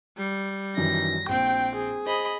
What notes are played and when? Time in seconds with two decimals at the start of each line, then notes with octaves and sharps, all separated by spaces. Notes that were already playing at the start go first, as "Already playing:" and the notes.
0.17 G3
0.77 F#2 D#3 E3 A#6
1.29 A#1 C4 G5
1.75 G#4
2.06 C5 D#5 B5